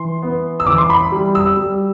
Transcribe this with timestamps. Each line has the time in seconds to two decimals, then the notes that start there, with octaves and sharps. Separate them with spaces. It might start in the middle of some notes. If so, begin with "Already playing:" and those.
Already playing: E3 C6
0.22 B3
0.60 E6
0.67 E3 D6
0.78 C6
0.90 B5
1.12 G3
1.35 E6
1.57 G3